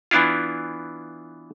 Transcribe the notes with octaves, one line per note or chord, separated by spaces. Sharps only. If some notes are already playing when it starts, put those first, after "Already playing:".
E3 B3 D4 E4 F4